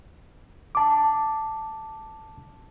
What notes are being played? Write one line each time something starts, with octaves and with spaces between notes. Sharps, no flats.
A5 D6